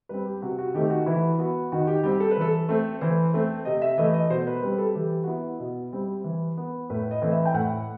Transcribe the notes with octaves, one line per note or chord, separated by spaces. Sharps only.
G3 C4 B4
G4
C3 F#4
F#4
D#3 A3 C4 G4
F#4
E3 E4
B3 F#4
D#3 F#4
G4
G3 C4 G4
A4
B4
E3 A4
A3 C4
E3 C5
A3 C4
C3 D#5
E5
E3 A3 D#5
D#5
B2 C5
B4
G3 C4 B4
A4
E3 G4
F#4
B3 E4
B2
G3 C4
E3
B3
A2 B4
D#5
E3 A3 C4
E5
G5
A2 F#5